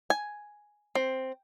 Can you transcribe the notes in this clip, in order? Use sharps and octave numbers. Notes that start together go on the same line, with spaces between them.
G#5
C4